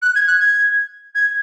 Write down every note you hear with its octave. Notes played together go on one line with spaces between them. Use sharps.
F#6
G#6
F#6
G#6
G#6